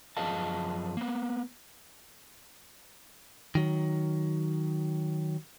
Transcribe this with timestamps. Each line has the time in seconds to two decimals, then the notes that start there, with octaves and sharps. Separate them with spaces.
0.17 F#2 F3 G#4 D#5 F5 A5
0.97 A#3 B3
3.55 D#3 F#3